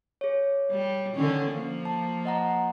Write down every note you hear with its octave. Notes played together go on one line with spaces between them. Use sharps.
G#4 C#5
G3
D3 D#3 C#4
F3 A#3
A5
D#5 F#5 A#5